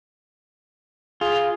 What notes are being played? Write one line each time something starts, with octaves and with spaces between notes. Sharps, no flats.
F4 G#4